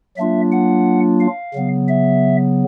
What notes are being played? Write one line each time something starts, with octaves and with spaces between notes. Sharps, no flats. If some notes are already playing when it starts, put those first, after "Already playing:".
F#3 A#3 D4 F4 E5
F#5
F5
C#3 F#3 B3
E5